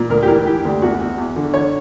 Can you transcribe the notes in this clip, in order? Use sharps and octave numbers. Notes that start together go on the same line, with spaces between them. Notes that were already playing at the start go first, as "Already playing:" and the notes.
Already playing: A#2
D2 A#4
G4
E3 A#4
E3 G4
D2
E2 F#4
E2
E2
D3
D3 C#5